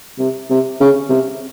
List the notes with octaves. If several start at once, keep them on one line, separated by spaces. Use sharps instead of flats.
C3
C3
C#3
C3